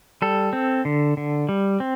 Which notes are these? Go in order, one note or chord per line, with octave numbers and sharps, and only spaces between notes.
G3 A4
C4
D3
D3
G3
C4